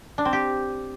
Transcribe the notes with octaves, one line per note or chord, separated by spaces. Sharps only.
D4
C4
G4